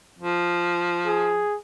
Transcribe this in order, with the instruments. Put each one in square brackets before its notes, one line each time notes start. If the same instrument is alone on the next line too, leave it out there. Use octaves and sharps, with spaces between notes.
[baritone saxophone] F3
[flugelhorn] G#4